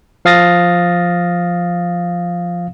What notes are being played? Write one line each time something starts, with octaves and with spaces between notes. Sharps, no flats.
F3 F5 D#6 A6 A#6